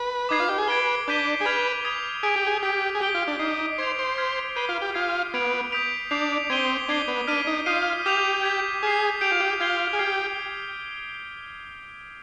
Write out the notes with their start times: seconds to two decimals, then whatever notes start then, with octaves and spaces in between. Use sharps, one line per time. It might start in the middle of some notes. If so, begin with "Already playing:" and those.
Already playing: B4
0.29 D#4 D6 G#6 C7
0.40 F4
0.49 G4
0.58 G#4
0.68 B4 G#6 D7 G7
1.08 D4 D6 G6 B6 D#7 G7
1.41 G#4
1.45 B4 F6 G#6 B6 F7
1.85 D#6 G#6 B6 F7
2.23 G#4 D#6 B6 D7
2.36 G4
2.47 G#4
2.63 G4 D#6 B6 D7
2.95 G#4
3.00 G4 G6 B6 D7 G7
3.15 F4
3.27 D4
3.39 D#4 D6 F6 C7
3.78 C5 D6 G#6 D7 F7
3.99 C5
4.18 F6 G#6 B6
4.56 B4 G6 C7 D#7 G7
4.69 F4
4.82 G4
4.94 F4 D#6 G#6 C7
5.34 B3 G#6 D7 F7
5.72 D#6 G6 B6 D7 F7
6.11 D4 D6 G6 C7 F7
6.50 C4 G#6 B6 D#7 G7
6.88 D4 G#6 C7 G7
7.08 B3
7.27 D4 F6 B6 D#7
7.47 D#4
7.66 F4 D#6 G6 C7 D#7
8.06 G4 D6 G6 B6 F7
8.43 G#6 B6 F7
8.83 G#4 D6 F6 C7
9.21 G4 G6 D7 F7
9.32 F4
9.40 G4
9.60 F4 G#6 C7 G7
9.93 G#4
9.99 G4 F6 G#6 C7